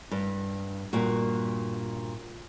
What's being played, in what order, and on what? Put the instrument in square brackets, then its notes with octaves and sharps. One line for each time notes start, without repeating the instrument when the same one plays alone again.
[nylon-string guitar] G2
G2 A#2 F#4